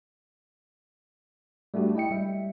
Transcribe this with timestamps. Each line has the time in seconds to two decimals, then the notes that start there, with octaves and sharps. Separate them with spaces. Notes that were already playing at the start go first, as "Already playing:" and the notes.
1.74 G3 A3 D4 F#4 G4
1.95 E4 D#5 G5 C#7
2.11 G3 E5